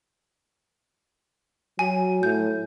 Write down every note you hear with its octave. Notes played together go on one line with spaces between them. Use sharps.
F#3 G#5
A2 G6